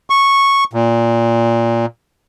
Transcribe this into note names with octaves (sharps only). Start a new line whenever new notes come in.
C#6
A#2